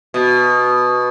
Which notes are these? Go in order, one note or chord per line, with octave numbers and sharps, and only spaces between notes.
B2